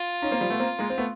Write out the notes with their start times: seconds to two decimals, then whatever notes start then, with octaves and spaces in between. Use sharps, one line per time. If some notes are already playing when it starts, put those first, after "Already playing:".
Already playing: F4
0.22 C#4 D#4
0.31 A#3 C4
0.41 F3 G3
0.50 A3 B3
0.60 A#3 C4
0.79 G#3 A#3
0.90 C4
0.98 A3 B3